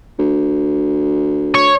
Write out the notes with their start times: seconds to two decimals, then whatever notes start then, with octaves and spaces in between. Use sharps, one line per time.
0.19 D2
1.55 C#5